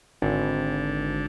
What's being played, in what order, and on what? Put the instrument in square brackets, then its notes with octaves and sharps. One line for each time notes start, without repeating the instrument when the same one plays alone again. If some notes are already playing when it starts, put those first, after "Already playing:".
[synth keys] G#1 [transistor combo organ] D3